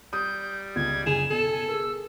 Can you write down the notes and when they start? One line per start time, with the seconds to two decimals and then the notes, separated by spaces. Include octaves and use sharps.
0.13 G3 D#6 G6
0.76 C#2 G#6
1.06 F#1 G#4 G#5 E7
1.30 B2 A4
1.51 G#5
1.68 G#4 A#4 E6